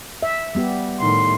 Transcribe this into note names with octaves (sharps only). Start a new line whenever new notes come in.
E5
G3 B3 G4
A2 D#3 C6